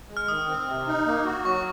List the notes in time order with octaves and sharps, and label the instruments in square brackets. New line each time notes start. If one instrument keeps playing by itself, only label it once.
[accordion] G#3
[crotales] F6
[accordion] D#3 [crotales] D#6
[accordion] C4
C3
D#4
A#3
F#4
[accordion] F#3 [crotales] C#6